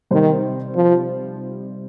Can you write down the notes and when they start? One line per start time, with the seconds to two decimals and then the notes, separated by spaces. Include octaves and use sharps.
0.11 C3 D#3 G3 D#4 C5
0.75 F3